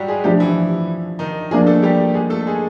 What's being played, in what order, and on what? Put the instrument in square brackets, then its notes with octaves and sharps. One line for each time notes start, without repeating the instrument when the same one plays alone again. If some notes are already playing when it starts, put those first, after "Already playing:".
Already playing: [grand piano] F#3 G3 F#4 G4
G#3 G#4
[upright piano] F3 A3 D4 [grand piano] G3 G4
[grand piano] E3 E4
D#3 D#4
[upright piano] F3 A#3 D4 [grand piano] G#3 G#4
[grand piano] A3 A4
G3 G4
G#3 G#4
A3 A4
A4
G#3 G#4